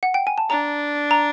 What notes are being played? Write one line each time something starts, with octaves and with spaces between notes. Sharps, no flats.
F#5
G5
G#5
A5
D4 A#5
A#5